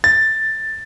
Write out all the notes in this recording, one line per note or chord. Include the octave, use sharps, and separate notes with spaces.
A6